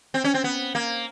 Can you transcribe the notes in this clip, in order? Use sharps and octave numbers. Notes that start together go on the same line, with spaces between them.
C4
C#4
C4
B3
A#3